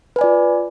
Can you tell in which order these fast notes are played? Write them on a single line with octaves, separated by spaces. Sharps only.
B4 G#5 D5 F4